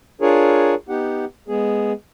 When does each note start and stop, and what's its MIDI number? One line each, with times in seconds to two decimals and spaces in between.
0.21 0.75 62
0.21 0.75 65
0.21 0.75 68
0.21 0.75 70
0.21 0.75 73
0.89 1.25 59
0.89 1.25 63
0.89 1.25 67
0.89 1.25 78
1.48 1.93 56
1.48 1.93 59
1.48 1.93 68